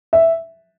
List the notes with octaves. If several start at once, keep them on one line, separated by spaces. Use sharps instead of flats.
E5